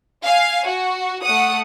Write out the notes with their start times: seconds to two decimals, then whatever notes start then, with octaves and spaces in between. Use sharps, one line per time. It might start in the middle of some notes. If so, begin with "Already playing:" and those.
0.25 F5 G#5
0.67 F#4
1.22 A3 F#5 D#6